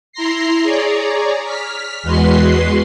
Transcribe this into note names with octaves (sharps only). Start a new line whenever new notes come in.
E4 A#5 C6 A#6 C7
G#4 C#5 D5 A#5
F6 B6
E2 G#3 F#4 B4 C6 C7